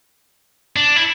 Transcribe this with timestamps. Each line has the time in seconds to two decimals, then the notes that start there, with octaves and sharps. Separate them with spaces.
0.76 D4
0.96 E4